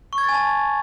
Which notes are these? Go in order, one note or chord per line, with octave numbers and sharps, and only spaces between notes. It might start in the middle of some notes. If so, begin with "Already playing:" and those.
C#6
G#6
A6
G#5
A5